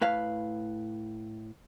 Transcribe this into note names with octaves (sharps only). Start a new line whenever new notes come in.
A2 B4 F5